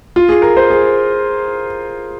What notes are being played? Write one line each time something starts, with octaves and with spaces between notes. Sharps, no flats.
F4
G#4
A#4
C5
G#4